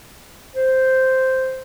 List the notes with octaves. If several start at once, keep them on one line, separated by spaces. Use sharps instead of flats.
C5